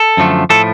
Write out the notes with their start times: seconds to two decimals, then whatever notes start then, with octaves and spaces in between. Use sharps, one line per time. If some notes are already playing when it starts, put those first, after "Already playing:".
Already playing: A4
0.17 F#2 D3 F3 A3
0.50 A2 F3 A3 A4